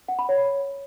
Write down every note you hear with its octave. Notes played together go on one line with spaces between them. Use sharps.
F#5
B5
C#5